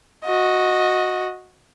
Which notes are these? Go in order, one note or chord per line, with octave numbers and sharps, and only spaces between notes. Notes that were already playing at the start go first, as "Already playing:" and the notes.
F#4 D#5